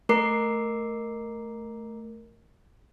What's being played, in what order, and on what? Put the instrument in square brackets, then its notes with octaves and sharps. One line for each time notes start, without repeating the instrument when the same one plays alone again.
[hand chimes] A3 A#4 A#5 D6 C7